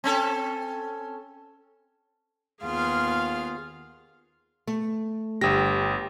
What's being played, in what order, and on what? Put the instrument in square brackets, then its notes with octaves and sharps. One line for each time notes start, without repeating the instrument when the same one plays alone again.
[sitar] C4 C#4 A4
[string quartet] D#2 B3 F4 G#4 F5 F6
[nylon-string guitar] A3
[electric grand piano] G1 A#6 [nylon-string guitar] G4